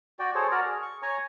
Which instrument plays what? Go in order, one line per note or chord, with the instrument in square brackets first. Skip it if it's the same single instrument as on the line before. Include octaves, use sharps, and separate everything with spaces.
[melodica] F#4 D5 G5
G#4 A4 C5 C#5
F#4 A#4 D5 A#5
G#4
C#6
C#5 G#5 A#5 C#6